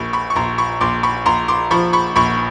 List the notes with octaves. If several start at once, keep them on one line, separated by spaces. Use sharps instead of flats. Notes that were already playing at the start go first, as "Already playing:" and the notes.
Already playing: A#1 A#2 B5 C#6
B5 C#6
C#6
A#1 A#5 C6
B5 C#6
A#1 C6 D6
B5 C#6
A#1 A#5 C6
C6 D6
F3 B5 C#6
B5 C#6
A#1 B5 C#6